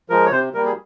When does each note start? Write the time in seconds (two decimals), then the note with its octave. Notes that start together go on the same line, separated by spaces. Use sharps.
0.09 F3 G#3 A#4
0.26 C#5
0.31 C3 C5
0.54 G3 A#3 A#4
0.66 G#4